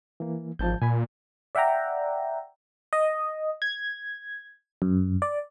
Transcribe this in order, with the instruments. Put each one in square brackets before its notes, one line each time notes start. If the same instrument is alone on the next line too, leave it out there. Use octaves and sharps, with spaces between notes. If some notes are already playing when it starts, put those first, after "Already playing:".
[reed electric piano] E3 A#3
[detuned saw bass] G#1 [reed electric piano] F3 A5 G6
[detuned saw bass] A#2 [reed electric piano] G#5 B5
[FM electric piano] D5 E5 F#5 G5 A#5
D#5
G#6
F#2
D5